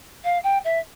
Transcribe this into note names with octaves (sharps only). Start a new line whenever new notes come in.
F5
G5
E5